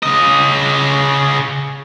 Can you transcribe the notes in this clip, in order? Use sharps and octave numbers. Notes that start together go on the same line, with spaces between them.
C#3 D#5